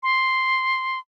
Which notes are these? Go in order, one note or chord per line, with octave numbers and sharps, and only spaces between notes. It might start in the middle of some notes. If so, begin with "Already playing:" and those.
C6